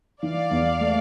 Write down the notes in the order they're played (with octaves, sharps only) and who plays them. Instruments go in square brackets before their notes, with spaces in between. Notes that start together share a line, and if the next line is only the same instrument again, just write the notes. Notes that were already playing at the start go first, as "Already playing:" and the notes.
[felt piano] E3 [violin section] D5 F5
[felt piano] E2
A3